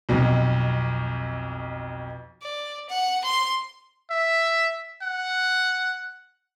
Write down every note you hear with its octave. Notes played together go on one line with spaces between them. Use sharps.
B1 F2 B2
D5
F#5
C6
E5
F#5